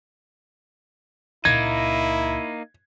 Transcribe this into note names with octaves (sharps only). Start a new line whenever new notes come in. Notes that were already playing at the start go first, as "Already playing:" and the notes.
C#2 A#2 A#3 D#4 E4 G#6